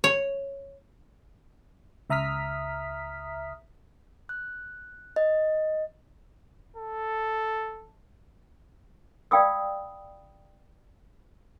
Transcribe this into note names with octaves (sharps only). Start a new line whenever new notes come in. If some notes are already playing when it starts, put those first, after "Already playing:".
C#5
C#2 E5 A#5 D#6 F6 B6
F#6
D#5
A4
D5 F5 G5 B5 D#6 E6